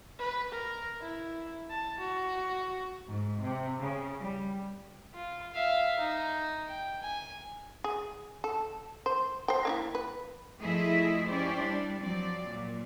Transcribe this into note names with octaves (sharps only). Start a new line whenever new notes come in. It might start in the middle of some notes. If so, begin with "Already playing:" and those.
B4
A#4
E4
A5
F#4
G#2
C3
C#3
G3
F4
E5 F5
D#4
G5
G#5
G#4
A4
C5
C5 G5
A#3 D#4 E4
B4
F3 A3 E4 G#4 D#5 E5
F3 C#4 E4 G4 C5 D5
G3 D4
F3 F#3 C4 D5
A#2